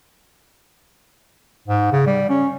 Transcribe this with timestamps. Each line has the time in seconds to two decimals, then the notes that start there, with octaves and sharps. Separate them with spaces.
1.68 G#2
1.92 C#3
2.07 G3
2.29 C#4